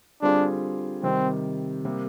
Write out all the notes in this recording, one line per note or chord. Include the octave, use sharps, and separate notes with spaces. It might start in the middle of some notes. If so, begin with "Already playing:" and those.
D3 G3 C4 D4 F4 G#4
C3 D#3 G3 C4
C3 G3 A#3